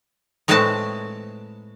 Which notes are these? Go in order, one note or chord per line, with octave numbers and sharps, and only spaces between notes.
A2 G#3 A3 C4 B4 A5